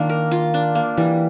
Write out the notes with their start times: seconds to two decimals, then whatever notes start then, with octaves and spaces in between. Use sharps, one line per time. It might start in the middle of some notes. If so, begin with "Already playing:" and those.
Already playing: D#3 A#3 D4 F4
0.09 A#4
0.31 F4
0.54 D4
0.75 A#3
0.97 E3 G3